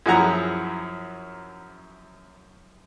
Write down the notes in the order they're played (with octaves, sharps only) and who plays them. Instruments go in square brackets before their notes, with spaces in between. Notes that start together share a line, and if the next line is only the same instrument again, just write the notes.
[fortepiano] F#2 F3 E4 G#4 F#5 A#5